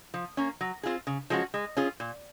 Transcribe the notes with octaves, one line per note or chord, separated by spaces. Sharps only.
F3
A#3 C#4
F#3
C4 F4 G#4
C#3
F3 G#3 C#4 F#4
G#3
C#4 F4 G#4
A#2